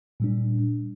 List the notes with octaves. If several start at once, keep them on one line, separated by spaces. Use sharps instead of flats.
A#2 G3 D4